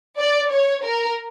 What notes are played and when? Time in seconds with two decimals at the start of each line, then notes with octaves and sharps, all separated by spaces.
0.18 D5
0.51 C#5
0.84 A#4